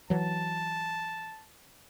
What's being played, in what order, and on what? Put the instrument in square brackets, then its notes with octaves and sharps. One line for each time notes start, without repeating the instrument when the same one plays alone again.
[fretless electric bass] E3 F#3 [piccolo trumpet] A5